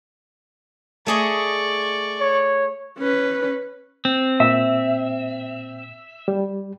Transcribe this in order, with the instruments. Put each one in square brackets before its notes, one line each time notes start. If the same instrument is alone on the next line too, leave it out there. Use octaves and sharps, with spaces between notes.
[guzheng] A3 G#4 D#5 [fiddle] D5 C#6
[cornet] C#5
[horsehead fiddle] C#4 B4
[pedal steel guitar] C4
[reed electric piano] A#2 [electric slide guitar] E5
[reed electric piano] G3